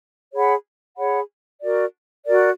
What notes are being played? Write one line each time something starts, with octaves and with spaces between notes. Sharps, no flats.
G#4 C#5 F#5 B5
G#4 C#5 F#5 B5
F#4 A#4 D5
F#4 A#4 D5